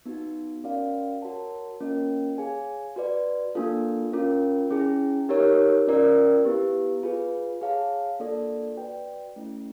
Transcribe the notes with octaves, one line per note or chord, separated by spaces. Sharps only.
B3 D#4 F#4
C#4 F#4 A#4 D5 F5
F#4 A#4 C#5 F#5 A5
A#3 C#4 F4 A#4 D#5
G#4 C#5 F5 G#5
F#4 B4 D5
A#3 D4 F4 A4
C#4 F4 A#4
C#4 E4 G#4
D#4 G4 A#4 C#5
C#4 F4 A#4 D5
B3 E4 G4 B4
F4 G#4 B4
G#4 C#5 F5 A5
A#3 D4 F4 A4 D5
F#4 B4 D5 G5
A3 C#4 E4